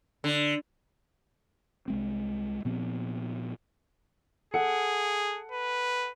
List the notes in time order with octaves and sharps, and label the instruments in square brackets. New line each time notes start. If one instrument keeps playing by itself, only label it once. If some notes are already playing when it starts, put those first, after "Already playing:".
[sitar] D3
[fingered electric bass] C2 G#3 C4
A#2 F3 B3 C4
[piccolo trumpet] G#4 [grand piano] A4 F#5 C#7
[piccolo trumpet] B4